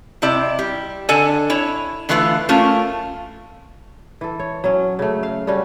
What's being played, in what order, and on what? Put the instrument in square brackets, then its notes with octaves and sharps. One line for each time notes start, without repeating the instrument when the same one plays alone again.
[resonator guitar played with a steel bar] C3 E4 D5
G3
D3 A4 D5 G#5
E4 C#5
D3 E3 A3 F4 B4
A3 A#3 C#4 F4
[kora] E3 A4
C#5
F#3 C#4
C#3 A3
F5
G3 A3 C#4 F#4